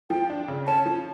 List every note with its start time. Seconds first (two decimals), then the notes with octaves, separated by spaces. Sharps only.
0.10 F3 G5
0.30 D4
0.48 C#3
0.67 C#4 A5
0.86 F3